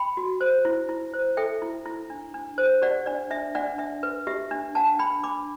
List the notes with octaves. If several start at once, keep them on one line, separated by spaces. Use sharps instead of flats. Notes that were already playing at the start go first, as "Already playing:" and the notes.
Already playing: G5 B5
F#4
C5
E4
E4
C5
A4 E5 G5
E4
E4
D4
D4
C5
G4 D5 F#5
D4 D5
D4 E5
D4 D5 F#5
D4 E5
B4
G4 E5
D4
D4 F#5 A5
D4 G5 B5
D4 B5 D6